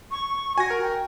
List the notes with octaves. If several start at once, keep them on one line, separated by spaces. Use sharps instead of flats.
C#6
F#4 G#5 A#6
A#4
G5